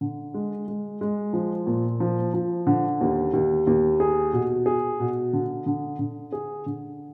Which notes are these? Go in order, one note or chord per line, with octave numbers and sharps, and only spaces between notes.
D3
G#3
G#3
G#3
F3
A#2
F3
F3
D3
D#2
D#2
D#2
G#4
B2
G#4
B2
D3
D3
D3
G#4
D3